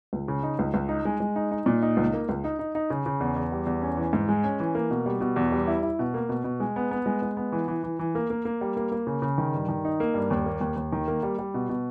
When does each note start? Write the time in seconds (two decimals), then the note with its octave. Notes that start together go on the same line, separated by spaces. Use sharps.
0.13 C#2
0.28 C#3
0.43 D#4
0.59 C#2
0.74 C#2
0.89 D#4
1.05 G#3
1.20 G#3
1.36 D#4
1.51 D#4
1.66 A#2
1.82 D#4
1.97 C#2
2.13 A#3
2.29 C#2
2.44 D#4
2.59 D#4
2.75 D#4
2.90 C#3
3.06 C#3
3.20 E2
3.36 E2
3.52 G3
3.66 E2
3.82 C#4
3.97 E3
4.13 G#2
4.29 G#3
4.44 C#4
4.60 E3
4.75 A#3
4.90 B2
5.06 G3
5.21 B2
5.36 E2
5.52 G3
5.67 E4
5.83 E4
5.99 B2
6.14 A#3
6.29 B2
6.44 B2
6.60 G#3
6.76 B3
6.91 B3
7.06 G#3
7.22 G#3
7.37 B3
7.52 E3
7.68 E3
7.83 E3
7.99 E3
8.15 A#3
8.30 A#3
8.45 A#3
8.61 G3
8.77 A#3
8.92 A#3
9.07 C#3
9.22 C#3
9.38 D#3
9.53 G2
9.68 D#3
9.85 D#4
10.00 A#3
10.14 G2
10.30 D#2
10.46 A#3
10.61 D#2
10.76 D#2
10.92 D#3
11.08 A#3
11.23 G3
11.39 G3
11.54 B2
11.69 B2